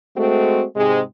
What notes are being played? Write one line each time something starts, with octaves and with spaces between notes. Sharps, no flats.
G#3 A3 C4 F#4
G#2 C3 G#3